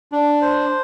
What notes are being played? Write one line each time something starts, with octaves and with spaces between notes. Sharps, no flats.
D4
C5